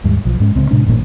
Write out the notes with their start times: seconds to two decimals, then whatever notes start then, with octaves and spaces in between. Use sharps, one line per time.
0.04 D#2 G#2 G3
0.25 B1 F3
0.40 G#2 G#3 C#4
0.56 D1 C#2 C4
0.71 A2 C3 G#3 D4
0.86 A1 G2 A#2 A#3